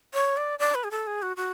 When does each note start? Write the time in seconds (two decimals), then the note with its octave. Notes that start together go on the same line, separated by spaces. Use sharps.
0.14 C#5
0.37 D5
0.59 D5
0.75 B4
0.84 G#4
0.91 A4
1.07 G#4
1.22 F#4
1.37 F#4